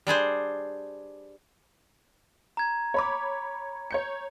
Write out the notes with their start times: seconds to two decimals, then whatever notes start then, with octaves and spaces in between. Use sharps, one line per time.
0.07 G3 D4 G#4 C5
2.57 A#5 G#6
2.94 C#5 B5 D6
3.91 C#5 G6 C#7